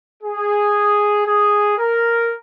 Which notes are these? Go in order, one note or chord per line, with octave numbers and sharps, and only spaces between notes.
G#4
G#4
A#4